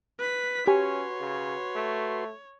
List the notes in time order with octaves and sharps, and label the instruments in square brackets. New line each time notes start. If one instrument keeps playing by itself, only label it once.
[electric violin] B4 B6
[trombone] C#4 [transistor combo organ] F#4 B4 C6 [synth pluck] G4 G#5 [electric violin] C#5
[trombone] C#3
A3